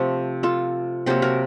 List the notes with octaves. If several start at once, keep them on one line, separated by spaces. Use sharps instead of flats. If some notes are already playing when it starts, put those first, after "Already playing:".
Already playing: C3 F3 A3 A4 C5
F4 A4
C3 F#3 A#3 A4 C5
F#4 A#4